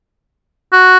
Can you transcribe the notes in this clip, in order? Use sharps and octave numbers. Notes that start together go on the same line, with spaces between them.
F#4